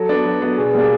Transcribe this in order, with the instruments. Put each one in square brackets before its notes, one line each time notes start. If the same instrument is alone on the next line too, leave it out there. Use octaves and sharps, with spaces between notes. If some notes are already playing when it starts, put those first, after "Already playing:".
Already playing: [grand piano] F#3 [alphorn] A4
[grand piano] B3 D4
F#3
B3 D4
[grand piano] B2 [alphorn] G#4
[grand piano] G3 A#3 D4